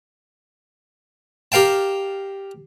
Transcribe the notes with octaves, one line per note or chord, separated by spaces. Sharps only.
G4 A#4 F5 G5 A5